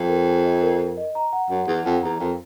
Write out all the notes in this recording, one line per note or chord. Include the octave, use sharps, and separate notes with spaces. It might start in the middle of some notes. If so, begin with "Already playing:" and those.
Already playing: F2
A#4
G#5
D#5
A#4
A#4
D#5
A#5
F#5
F#2 F#5
E2 F#5
F2 F#5
E2 A#5
F2 A#4